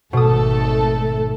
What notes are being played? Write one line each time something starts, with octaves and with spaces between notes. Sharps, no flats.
G#1 B2 A3 A4 D#6